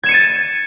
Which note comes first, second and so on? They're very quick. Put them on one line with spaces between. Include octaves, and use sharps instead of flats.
G#6 E7 C#7 D#7 A6